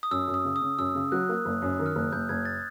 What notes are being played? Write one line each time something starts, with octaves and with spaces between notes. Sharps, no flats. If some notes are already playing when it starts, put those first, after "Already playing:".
D#6
F#2 E6
F#2
D#6
C#3
D#6
C#3
F#2 E6
C#3
F#3 F#6
A#3
F#1
F#2
D#3
F6
F#1 F#6
F#1 G6
F#1 G#6
A6